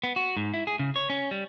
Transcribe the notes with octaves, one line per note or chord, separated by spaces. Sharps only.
B3
F#4
G#2
E4
G#4
C#3
C#5
C#4
G3